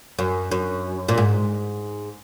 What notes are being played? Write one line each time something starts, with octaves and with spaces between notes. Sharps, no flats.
F#2
F#2
A#2
G#2